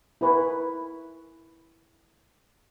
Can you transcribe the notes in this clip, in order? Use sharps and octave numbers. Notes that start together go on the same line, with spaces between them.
E4 A#4 B4 G#5 C#6